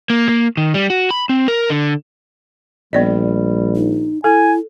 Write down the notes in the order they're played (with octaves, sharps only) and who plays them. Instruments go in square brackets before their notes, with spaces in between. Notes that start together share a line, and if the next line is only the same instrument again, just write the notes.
[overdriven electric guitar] A#3
A#3
D#3
G3
F#4
B5
C4
A#4
D3
[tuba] A#1 [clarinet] G3 [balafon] B3 D5 D#5
[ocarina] D#4
[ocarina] E4 [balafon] A4 [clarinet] G#5